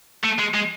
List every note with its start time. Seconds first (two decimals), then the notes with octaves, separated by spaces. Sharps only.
0.24 A3
0.38 G#3
0.54 G#3